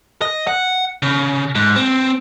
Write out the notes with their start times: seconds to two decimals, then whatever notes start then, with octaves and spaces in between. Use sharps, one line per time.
0.21 D#5
0.47 F#5
1.03 C#3
1.55 G#2
1.76 C4